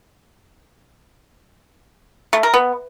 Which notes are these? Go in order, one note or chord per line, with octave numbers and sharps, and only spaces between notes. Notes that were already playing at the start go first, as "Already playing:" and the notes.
A3
A#4
B3